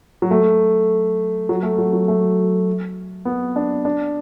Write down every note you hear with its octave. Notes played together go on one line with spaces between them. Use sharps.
F#3
A3
F#3
A3
F#3
F#3
A3
B3
D4
D4